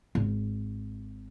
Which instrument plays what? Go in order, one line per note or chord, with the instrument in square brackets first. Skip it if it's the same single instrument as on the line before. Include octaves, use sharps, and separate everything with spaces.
[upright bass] G#1